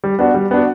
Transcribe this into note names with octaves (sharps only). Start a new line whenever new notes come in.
G3
B3 D4 F#4
G3
B3 D4 F#4